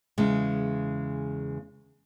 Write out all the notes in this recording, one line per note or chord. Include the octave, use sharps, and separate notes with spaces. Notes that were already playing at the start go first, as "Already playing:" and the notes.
E2 C#3 G#3